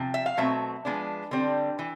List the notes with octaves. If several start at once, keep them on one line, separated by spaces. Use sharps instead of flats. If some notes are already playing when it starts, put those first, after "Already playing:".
Already playing: C3 F3
E5
F5
B2 F#3 A3 C4 E5
F3 G#3 B3 D4
D3 G3 C4
E3